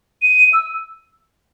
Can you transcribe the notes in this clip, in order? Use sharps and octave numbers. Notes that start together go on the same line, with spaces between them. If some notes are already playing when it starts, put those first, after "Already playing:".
D#7
E6